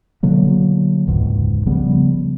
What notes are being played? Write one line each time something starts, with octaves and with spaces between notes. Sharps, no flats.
B2 D3 F#3 A#3
E1 C#2 G#2
C#3 F3 G3 B3